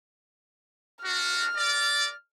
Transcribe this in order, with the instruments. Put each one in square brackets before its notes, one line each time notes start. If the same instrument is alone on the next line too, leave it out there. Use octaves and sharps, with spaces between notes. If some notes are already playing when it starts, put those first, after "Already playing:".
[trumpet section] D4 F#4 [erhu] F6
[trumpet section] A#4 D5